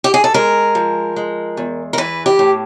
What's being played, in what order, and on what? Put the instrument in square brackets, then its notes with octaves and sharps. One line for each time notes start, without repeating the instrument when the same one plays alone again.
[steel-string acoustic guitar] G4
G#4
A4
G#3 A#4
F3
G#3
E2
A#4
E3 B4
G4
A2